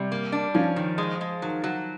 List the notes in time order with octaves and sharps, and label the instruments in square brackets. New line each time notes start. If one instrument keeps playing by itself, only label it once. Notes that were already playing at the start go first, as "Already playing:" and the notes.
Already playing: [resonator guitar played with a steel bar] C3 [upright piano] G3
[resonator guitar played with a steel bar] A#3
D4
[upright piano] F3 [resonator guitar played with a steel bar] C#4
[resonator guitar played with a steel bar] D#3
G#3
G#3
[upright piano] D#3 [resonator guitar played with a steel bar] F#3
[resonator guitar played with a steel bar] F#3